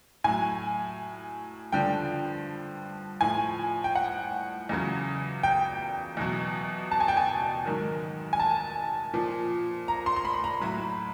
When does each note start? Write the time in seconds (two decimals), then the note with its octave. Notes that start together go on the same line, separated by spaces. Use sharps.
0.24 A2 F#3 G#5
1.72 G2 D3 F3 G5
3.21 A2 F3 G#5
3.84 G5
3.95 F#5
4.69 E2 C#3 F#3
5.43 G5
6.17 E2 B2 F#3
6.91 A5
7.00 G#5
7.08 G5
7.17 G#5
7.66 G#2 D#3 F#3
8.33 G#5
8.40 A5
9.14 A#2 F3
9.88 A#5
10.06 C6
10.16 C6
10.25 B5
10.44 A#5
10.61 A2 F#3 B5